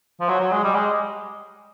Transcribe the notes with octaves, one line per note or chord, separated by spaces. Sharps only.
F3
F#3
F#3
G#3
G3
G#3